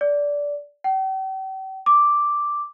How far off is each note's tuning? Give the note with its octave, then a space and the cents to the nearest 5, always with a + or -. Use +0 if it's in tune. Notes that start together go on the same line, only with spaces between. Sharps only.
D5 -15
G5 -45
D6 +0